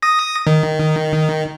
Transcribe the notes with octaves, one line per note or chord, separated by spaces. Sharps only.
D#6 A#6
D#3